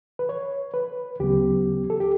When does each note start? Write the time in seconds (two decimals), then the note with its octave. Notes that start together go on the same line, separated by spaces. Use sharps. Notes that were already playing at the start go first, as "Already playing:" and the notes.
0.19 B4
0.29 C#5
0.74 B4
1.20 D2 C#3 F#3 B3 G4
1.90 A4
2.00 G4